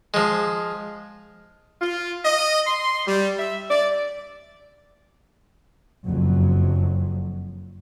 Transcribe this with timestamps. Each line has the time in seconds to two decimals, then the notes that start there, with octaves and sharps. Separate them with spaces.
0.14 F3 G#3
1.81 F4
2.25 D#5
2.67 C6
3.07 G3
3.37 E5
3.69 D5
6.06 F#1 F2 F#3